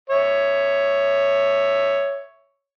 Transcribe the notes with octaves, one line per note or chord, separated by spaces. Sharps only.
C#5 E5